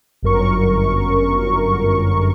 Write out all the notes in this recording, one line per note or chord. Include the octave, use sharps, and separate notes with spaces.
G1 F#2 A#4 C#6